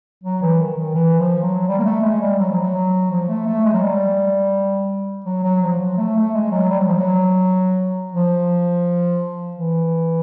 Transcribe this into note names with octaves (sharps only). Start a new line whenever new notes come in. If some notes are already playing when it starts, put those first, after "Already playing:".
F#3
E3
D#3
D#3
E3
F3
F#3
G3
A#3
A3
G#3
G3
F#3
F3
F#3
F3
A3
A3
G#3
F#3
G3
F#3
F#3
F3
F#3
A3
A3
G#3
F#3
G3
F#3
F3
F#3
F3
E3